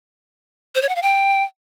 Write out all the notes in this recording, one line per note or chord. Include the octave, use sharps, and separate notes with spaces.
C5
C#5
F#5
F5
G5